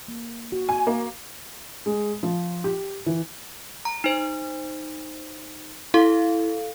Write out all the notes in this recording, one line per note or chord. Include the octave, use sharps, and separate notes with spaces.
A#3
F#4
G#5
A#3
G#3
F3
G4
E3
A#5
D#4 C5
E4 A4 F5